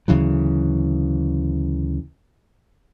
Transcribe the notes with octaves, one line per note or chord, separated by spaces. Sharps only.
D2 C#3 E3 F#3